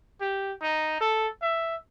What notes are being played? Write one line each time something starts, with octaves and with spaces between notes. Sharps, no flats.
G4
D#4
A4
E5